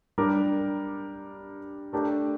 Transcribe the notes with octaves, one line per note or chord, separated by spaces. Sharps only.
G3 D4 G4 A#4
A3 D4 G4 A#4